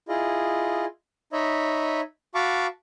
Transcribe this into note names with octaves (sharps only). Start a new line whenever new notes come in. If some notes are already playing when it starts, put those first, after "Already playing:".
E4 F4 G#4 D#5
D#4 C#5 D#5 E5 B5
F#4 F5 A5 B5 C#6 D6